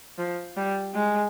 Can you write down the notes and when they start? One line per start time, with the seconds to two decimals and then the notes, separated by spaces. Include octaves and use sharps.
0.18 F3
0.57 G3
0.94 G#3